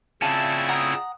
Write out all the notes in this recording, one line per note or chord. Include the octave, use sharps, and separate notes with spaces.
C#3 C4 C#4 E4 F4 D5 E5 A5
F#5 A#5 D#6